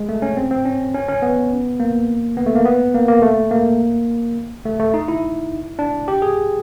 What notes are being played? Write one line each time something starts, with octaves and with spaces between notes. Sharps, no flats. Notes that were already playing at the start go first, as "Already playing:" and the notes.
Already playing: G#3
A3
C#4
C4
C4
C#4
C#4
C#4
B3
A#3
B3
A3
A#3
B3
A#3
A#3
A3
A#3
A3
A3
D#4
E4
D4
G4
G#4